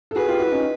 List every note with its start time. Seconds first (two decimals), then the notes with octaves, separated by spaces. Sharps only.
0.11 A4
0.16 F#4 G#4 B4
0.28 F4 G4
0.39 E4 F#4
0.52 C#4 D#4